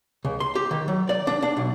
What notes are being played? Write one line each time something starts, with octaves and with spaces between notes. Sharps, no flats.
C#2
C6
G4
D#3
F#3
D5
D4
D4
B1